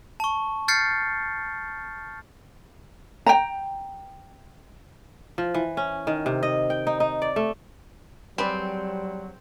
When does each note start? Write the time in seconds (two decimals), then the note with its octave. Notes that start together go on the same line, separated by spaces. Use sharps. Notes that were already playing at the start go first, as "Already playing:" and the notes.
0.20 A5 C#6
0.68 F6 G6 A6 C7 C#7
3.26 G5 A#5
5.38 F3
5.54 E3
5.77 C#4
6.07 D#3
6.26 C3
6.43 D#5
6.70 G5
6.87 D#4
7.00 D#4
7.22 D5
7.36 A3
8.38 F#3 G3 C4 G#4 B4 D5